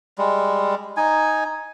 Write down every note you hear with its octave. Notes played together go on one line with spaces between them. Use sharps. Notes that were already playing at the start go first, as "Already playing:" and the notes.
G3 G#3
D#4 G#5